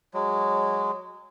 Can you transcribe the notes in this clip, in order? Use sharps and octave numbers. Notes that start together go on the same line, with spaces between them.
F#3 G#3